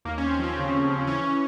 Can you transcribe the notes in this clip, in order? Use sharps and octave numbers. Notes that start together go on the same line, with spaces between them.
D#2 A#3
C#4
D#2 C4
C#4
F3 C4
C#3
D#2
C#3
E3 C#4